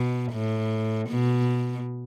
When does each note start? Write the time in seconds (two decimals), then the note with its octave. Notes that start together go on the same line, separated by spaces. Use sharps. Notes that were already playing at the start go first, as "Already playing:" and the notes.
Already playing: B2
0.33 A2
1.09 B2